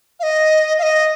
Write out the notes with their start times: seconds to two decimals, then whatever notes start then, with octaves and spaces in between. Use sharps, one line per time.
0.20 F5
0.23 D#5
0.79 F5
0.83 D#5